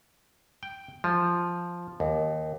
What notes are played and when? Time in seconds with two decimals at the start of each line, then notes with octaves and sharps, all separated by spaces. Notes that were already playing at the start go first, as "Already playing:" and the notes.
0.63 G5
1.04 F3
2.00 D#2